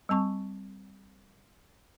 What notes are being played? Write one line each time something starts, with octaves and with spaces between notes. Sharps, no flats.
G3 C4 A5 C#6